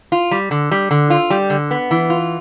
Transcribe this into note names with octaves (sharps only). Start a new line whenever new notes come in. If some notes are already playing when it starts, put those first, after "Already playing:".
F4
G3
D3
G3
D3
F4
G3
D3
B3
E3
F4